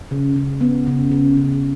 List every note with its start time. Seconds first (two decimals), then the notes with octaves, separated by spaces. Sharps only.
0.11 C#3
0.36 C#3
0.61 B3
0.87 C#3
1.11 C#3
1.37 C#3